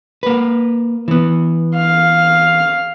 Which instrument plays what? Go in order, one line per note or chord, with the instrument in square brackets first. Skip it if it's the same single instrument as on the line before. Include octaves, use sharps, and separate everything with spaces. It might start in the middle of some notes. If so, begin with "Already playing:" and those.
[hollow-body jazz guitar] A#3 B4
E3 B3
[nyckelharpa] F5